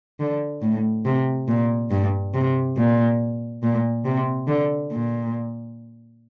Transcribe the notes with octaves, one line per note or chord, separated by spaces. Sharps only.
D3
A2
C3
A#2
G2
C3
A#2
A#2
C3
D3
A#2